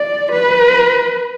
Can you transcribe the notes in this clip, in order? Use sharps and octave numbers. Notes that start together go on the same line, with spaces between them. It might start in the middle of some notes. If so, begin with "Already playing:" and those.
Already playing: D5
B4